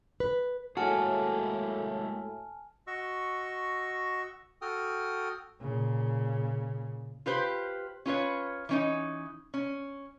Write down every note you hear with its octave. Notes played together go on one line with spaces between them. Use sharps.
B4
A2 G#3 A#3 F#4 G#4 G#5 A5 F6
F#4 D#5 C#6 E6
F#4 A4 G5 D#6 F6
A#2 C#3
F4 G4 B4 C5
C#4 F4 B4 C#5
E3 C#4 D#4
C#4